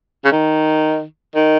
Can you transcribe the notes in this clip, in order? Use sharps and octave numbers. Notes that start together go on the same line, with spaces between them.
C#3
D#3
D#3